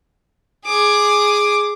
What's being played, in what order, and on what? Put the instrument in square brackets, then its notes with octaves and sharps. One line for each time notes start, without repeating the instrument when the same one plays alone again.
[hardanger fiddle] G#4 D6